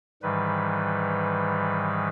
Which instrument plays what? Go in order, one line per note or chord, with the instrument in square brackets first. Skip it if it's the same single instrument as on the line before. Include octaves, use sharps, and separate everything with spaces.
[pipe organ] G#2 D#3 E3 G3 B4